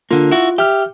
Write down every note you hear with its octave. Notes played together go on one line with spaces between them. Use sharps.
D3 A#3 F4
E4 F#4
G4 E5 F6